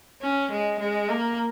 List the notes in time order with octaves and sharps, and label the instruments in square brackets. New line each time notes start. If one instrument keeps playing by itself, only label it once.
[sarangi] C#4
G#3
G#3
A#3